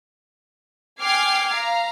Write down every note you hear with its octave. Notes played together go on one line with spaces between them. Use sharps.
G5 G#5 D6 F6 G#6 C7
F5 A#5